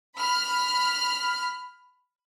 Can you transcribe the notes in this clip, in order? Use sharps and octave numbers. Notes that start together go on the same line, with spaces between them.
B5 F6